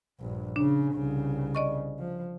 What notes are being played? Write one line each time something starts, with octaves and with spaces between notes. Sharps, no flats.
A#1 G2
C#3 D4
C2 C#3
D5 D#5 C#6
F3